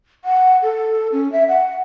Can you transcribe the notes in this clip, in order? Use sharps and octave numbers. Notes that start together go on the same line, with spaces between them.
F#5
A4
C#4
E5
F#5